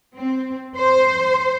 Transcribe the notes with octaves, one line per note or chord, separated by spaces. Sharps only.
C4
C5